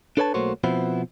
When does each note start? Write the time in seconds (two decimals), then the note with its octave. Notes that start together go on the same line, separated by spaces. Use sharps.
0.17 D4 A4 B4 C#5 G5 A5
0.34 B1 A3 A#3 F#4 C5 C#5
0.64 B2 F3 B3 C4 E4 F#4